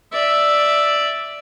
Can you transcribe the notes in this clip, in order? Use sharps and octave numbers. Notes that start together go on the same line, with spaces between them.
D5 E5